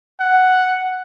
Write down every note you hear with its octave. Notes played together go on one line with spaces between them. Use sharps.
F#5